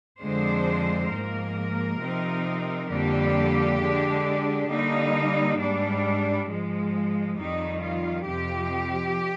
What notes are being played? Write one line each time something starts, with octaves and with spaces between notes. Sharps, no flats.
F2 D3 G#3 D4 C5
G#2 F3 A#3 A#4
C3 F3 C4 D#4
F2 D3 G3 A#3 D4 G4
D3 G#3 D4
D3 G3 A#3 D#4
G#2 G3 D4
G#2 F3 G#3
F2 D#3 G3 D#4
F4
F2 C3 F3 G4